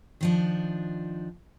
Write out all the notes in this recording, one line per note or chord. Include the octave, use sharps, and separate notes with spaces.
D#3 F3 D4